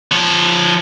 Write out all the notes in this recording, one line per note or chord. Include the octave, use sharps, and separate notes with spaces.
F3 C#5